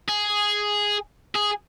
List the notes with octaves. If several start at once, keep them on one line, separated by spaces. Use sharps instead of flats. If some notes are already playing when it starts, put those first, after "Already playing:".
G#4
G#4